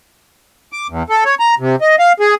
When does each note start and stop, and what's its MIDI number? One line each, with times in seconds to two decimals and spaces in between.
0.73 0.87 86
0.90 1.03 40
1.09 1.24 69
1.25 1.35 73
1.40 1.55 82
1.60 1.76 48
1.81 1.96 75
1.99 2.13 77
2.20 2.35 68